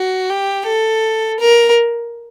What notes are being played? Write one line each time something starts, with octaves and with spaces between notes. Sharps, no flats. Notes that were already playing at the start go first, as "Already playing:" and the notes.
Already playing: F#4
G4
A4
A#4